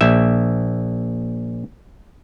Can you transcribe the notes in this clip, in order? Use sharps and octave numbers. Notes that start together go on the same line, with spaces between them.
A#1 E5